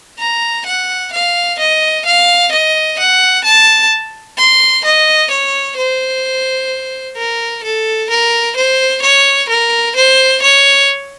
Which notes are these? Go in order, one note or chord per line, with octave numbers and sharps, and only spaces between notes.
A#5
F#5
F5
D#5
F5
D#5
F#5
A5
C6
D#5
C#5
C5
A#4
A4
A#4
C5
C#5
A#4
C5
C#5